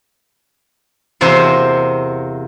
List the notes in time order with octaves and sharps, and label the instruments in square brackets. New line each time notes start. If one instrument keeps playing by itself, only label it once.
[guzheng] E2 C3 A#3 F#4 C5